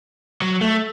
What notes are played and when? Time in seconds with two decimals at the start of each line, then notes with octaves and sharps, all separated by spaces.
0.42 F#3
0.61 A3